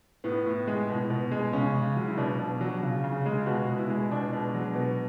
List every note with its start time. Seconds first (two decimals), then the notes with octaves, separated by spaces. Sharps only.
0.24 A2 B3
0.46 A2
0.67 G#3
0.89 B2
1.10 B2
1.31 G#3
1.53 C#3 C#4
1.74 C#3
1.97 F#3
2.07 E4
2.18 B2 D4
2.39 B2
2.61 F#3
2.83 C#3
3.04 C#3
3.26 G#3
3.46 B2 F#4
3.68 B2
3.79 E4
3.90 G#3
4.11 B2 D4
4.33 B2
4.54 F#3
4.75 B2